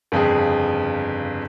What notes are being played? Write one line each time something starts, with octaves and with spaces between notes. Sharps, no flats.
G1 F2 C#3 G#4